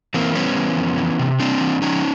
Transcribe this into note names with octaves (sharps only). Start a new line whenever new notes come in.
E3 A#3 C4
G3 B3 C#4
E3
F2
E3
C3
G3 C4 D4
E3
F3 C#4 D#4